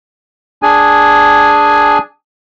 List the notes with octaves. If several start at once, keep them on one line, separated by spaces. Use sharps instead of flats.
D4 G#4 G#5